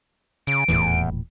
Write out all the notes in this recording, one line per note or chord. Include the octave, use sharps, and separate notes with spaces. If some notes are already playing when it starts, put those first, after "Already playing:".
C#3 D7
D#1 E2 A2 E3